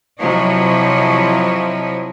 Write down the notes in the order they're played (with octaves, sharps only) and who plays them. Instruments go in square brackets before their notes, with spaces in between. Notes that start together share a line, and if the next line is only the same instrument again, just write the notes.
[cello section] C3 F3 F#3 E4 C#5 D#5